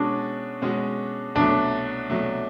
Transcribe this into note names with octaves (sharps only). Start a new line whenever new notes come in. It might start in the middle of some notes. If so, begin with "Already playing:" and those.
Already playing: B2 G#3 C#4 D4 F#4
B2 G#3 C#4 F#4
C2 B2 F#3 A3 D4
C2 B2 F#3 A3